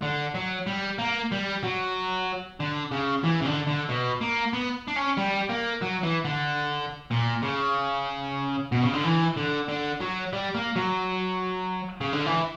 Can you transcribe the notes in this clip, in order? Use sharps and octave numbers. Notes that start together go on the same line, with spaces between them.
D3
F#3
G3
A#3
G3
F#3
D3
C#3
E3
C#3
D3
D3
B2
A#3
B3
D4
C#4
G3
A#3
F#3
E3
D3
A#2
C#3
B2
C#3
D3
E3
D3
D3
F#3
G3
A#3
F#3
C#3
D3
E3